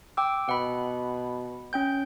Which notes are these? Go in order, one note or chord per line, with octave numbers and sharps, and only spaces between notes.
G5 D6 E6
B2 F#5 B5
C#4 G5 G6